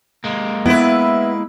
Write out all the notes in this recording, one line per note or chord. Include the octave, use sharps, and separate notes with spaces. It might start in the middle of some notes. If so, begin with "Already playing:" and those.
G#3 A#3
B3 E4 B4 E5